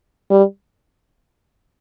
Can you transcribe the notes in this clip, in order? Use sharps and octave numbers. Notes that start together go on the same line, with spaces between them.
G3